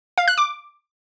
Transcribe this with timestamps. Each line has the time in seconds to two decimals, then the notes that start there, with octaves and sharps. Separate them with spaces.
0.18 F5
0.28 F#6
0.38 D6